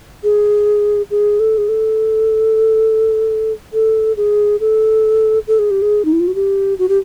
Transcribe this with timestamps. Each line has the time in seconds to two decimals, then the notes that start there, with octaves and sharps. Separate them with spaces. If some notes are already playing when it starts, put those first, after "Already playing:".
0.24 G#4
1.11 G#4
1.40 A4
1.58 G#4
1.69 A4
3.73 A4
4.17 G#4
4.60 A4
5.48 A4
5.59 G#4
5.71 G4
5.82 G#4
6.05 D#4
6.13 E4
6.20 F4
6.28 F#4
6.35 G4
6.79 F#4
6.89 G4